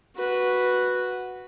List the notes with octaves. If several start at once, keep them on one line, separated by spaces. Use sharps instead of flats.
F#4 B4